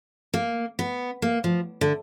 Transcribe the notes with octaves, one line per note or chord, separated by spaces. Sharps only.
A#3
B3
A#3
F3
D3